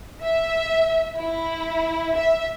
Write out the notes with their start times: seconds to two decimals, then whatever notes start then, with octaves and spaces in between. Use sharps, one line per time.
0.22 E5
1.16 E4
2.14 E5